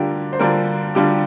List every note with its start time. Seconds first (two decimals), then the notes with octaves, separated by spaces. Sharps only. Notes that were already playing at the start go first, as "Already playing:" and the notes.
Already playing: D3 G3 D4 F4 G4 A#4
0.33 C5
0.39 D3 G3 D4 F4 A#4
0.95 D3 G3 D4 F4 G4